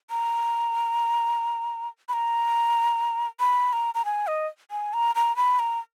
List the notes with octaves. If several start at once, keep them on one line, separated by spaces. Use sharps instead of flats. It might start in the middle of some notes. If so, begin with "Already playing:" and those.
A#5
B5
A#5
B5
A#5
A#5
G#5
D#5
G#5
A#5
A#5
B5
A#5